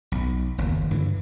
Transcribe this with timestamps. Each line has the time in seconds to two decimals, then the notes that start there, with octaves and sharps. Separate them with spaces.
0.12 B1
0.58 F#1 D#2 B2
0.91 G2 D3 E3